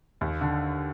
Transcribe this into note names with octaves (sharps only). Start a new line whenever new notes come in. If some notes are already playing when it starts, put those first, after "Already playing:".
D#2
D3